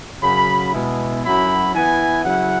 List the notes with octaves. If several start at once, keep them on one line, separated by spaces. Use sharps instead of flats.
F#2 C#3 F#3 B5
B2 G#3 E4
F#2 F#3 E4 B5
E3 B3 E4 G#5
C#3 F#3 C#4 E4 F#5